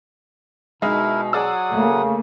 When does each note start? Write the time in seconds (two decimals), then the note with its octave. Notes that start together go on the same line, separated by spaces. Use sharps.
0.82 B2 G#3 D#4 E4 A#4 E5
1.33 F#3 G#4 D5 F#5 D#6 E6
1.71 C#3 A3 A#3